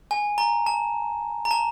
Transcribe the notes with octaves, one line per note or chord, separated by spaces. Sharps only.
G#5
A#5
A5
A#5
A5